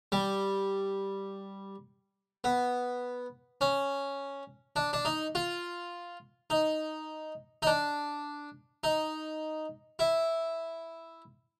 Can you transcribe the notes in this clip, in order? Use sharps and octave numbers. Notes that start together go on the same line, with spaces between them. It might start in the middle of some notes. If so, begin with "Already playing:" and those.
G3
B3
C#4
D4
D4
D#4
F4
D#4
D#4
D4
D#4
E4